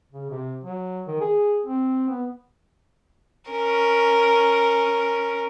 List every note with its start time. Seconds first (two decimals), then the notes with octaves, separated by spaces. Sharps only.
0.12 C#3
0.31 C3
0.64 F#3
1.08 D#3
1.21 G#4
1.66 C4
2.09 B3
3.50 C#4 A#4